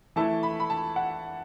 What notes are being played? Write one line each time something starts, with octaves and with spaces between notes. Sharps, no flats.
E3 A3 E4 A5
B5
B5
A5
F#5